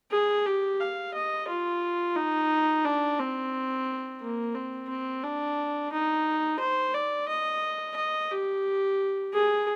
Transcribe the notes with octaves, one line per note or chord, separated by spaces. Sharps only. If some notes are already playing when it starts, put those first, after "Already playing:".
G#4
G4
F5
D#5
F4
D#4
D4
C4
A#3
C4
C4
D4
D#4
C5
D5
D#5
D#5
G4
G#4